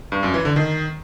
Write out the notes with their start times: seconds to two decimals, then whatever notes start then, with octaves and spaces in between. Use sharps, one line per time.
0.12 G2
0.23 F#2
0.34 E3
0.45 D3
0.56 D#3